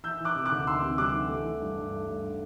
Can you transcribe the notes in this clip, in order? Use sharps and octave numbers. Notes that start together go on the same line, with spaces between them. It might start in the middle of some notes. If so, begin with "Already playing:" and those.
E3 E6 G6
E3 D6 F#6
C3
D6 F#6
D2
E3 C6 E6
C3
G3 D6 F#6
E3
A3
E3
G2
G2
A3
G2